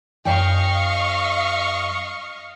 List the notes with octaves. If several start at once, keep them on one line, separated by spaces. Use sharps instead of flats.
F#2 D#5 F5 G5 C#6